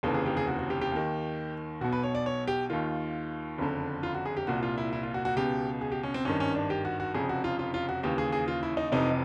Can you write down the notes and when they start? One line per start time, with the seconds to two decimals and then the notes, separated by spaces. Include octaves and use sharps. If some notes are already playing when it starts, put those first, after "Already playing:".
0.03 F1 D#2 C#3 E3 A4
0.14 G#4
0.26 G4
0.37 G#4
0.47 F#4
0.59 F#4
0.70 G4
0.81 G4
0.92 D#2 D#3
1.81 B1 F#4
1.84 B2
1.93 B4
2.03 C#5
2.15 D5
2.26 C#5
2.47 G4
2.70 D#2 D#3 F4
3.58 F#1 F2 D3
4.03 F4
4.15 F#4
4.26 G#4
4.37 G4
4.47 C2 A#2 F#4
4.63 F4
4.78 E4
4.93 E4
5.03 F4
5.14 F#4
5.25 F#4
5.36 C#2 B2 G4
5.81 G#4
5.92 G4
6.03 C#4
6.14 C4
6.25 G#1 G2 D#3 C#4
6.40 C#4
6.55 D4
6.70 G4
6.85 F#4
7.00 F#4
7.14 F1 F2 C#3 G#4
7.29 F#4
7.44 F4
7.59 F4
7.74 F4
7.89 F#4
8.03 D#2 C#3 E3 G4
8.18 G#4
8.32 G#4
8.48 F4
8.63 E4
8.77 D#4
8.92 F1 F2 C3 E3 D#4